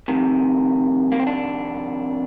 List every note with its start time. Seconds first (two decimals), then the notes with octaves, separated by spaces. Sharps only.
0.08 F2 C3 D#3
1.12 A#3
1.20 C4
1.27 D4